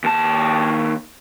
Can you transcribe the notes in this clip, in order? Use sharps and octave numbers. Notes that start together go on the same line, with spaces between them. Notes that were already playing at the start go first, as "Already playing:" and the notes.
D#2 A5